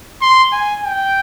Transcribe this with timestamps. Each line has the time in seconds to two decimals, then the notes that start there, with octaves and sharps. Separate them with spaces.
0.22 C6
0.53 G#5
0.84 G5